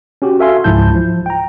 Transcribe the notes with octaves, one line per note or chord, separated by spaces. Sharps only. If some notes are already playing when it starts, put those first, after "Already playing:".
C#4 F#4 G4
F#4 A4 E5 F5 G#5 C6
C#2 G#2 F3 E4 A5 G6
F3
G5 A#5